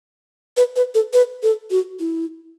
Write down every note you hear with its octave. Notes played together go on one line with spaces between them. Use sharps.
B4
B4
A4
B4
A4
F#4
E4